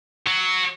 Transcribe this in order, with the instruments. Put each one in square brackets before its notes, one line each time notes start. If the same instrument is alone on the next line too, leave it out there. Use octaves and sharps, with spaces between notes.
[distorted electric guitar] F#3